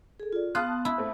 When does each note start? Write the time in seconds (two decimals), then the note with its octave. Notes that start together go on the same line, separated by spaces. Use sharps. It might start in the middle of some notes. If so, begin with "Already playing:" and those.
0.20 G#4 A4
0.33 F4 D5
0.55 B3 F4 A5 D#6 F#6
0.85 E4
0.98 A3 C4